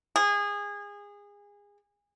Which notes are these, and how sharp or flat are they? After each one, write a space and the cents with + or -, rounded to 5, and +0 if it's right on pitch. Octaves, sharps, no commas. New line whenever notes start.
G#4 -25